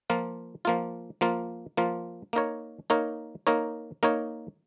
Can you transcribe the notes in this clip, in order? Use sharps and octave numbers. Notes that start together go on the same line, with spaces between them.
F3 A#3 F4
F3 A#3 F4
F3 A#3 F4
F3 A#3 F4
A#3 D#4 A#4 C#5
A#3 D#4 A#4 C#5
A#3 D#4 A#4 C#5
A#3 D#4 A#4 C#5